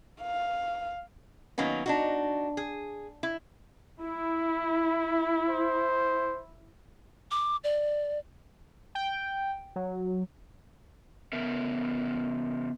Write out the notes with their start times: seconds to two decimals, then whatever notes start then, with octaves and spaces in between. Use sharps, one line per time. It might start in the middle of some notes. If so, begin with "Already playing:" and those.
0.22 F5
1.58 D#3 F#3 A#3 B3 C#4
1.86 D4 D#4 F#4
2.57 G#4
3.23 E4
4.00 E4
5.49 C5
7.31 D6
7.64 D5
8.95 G5
9.76 F#3
11.33 C#3 B3 A#4 E5